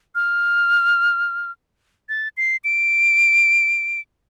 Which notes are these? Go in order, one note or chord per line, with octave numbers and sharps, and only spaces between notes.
F6
A6
C7
D7